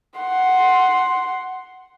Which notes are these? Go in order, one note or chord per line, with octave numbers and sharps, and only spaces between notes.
F#5 C6